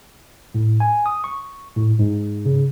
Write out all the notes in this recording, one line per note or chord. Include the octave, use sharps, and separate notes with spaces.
A2
G#5
D#6
C#6
A2
G#2
C#3